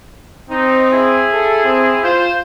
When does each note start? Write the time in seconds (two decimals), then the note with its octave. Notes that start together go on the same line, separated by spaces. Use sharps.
0.50 C4 D#4
0.92 E4 G#4
1.32 A4
1.64 C4
2.03 F4 C5